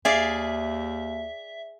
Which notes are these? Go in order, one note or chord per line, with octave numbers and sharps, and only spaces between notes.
D#2 G#4 D5 E5 F5